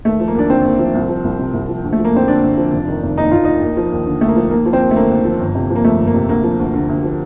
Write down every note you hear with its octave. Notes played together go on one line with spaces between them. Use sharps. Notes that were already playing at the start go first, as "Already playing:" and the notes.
D#2 A3
F3
A#3
D#2 D4
D3 C4
D#2
F3
C2
F3
C2
C3
C2
F3
D2
A3
F3
A#3
D2 C4
D3 D4
D2
F3
F1
D#3
F1
D#2 D#4
F1 F4
D#3 D#4
D#2
F3
D#2
D3
D#2 A3
A#3
F3
D#2 A#3
F3
C4
D#2
A3
D3 A#3
D#2
F3
G1
C3
F3
A#3
F2 A3
G1
A#3
C3
D2 A#3
F3
D2
D3
D2
F3